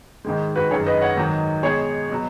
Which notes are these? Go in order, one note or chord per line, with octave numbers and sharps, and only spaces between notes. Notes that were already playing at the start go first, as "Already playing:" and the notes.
G#2 D#3 G#3
F#4 B4
F#2 D#3 G#3 G#4 C#5
B4 D#5
C#5 F#5
G#2 D#3 F#3
B2 G#3 G#4 C#5
B2 F#3